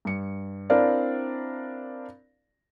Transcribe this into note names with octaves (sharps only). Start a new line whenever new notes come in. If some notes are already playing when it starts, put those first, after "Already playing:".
G2 C#7
C4 D4 E4 A#4 D5 F5